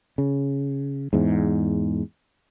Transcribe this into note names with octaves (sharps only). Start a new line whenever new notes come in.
C#3
E2 G#2